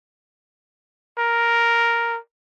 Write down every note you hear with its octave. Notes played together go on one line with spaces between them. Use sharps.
A#4